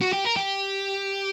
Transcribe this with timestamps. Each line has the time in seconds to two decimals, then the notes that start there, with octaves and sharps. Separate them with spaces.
0.01 F#4
0.13 G4
0.25 A#4
0.37 G4